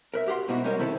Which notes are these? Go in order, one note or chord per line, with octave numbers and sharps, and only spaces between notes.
A#4 B4 E5
F#4 G4 F#5 C6
G#2 B2 D#4 E4 F#4
G3 G#3 C#4 A#4 D#5
C3 D#3 E4 A4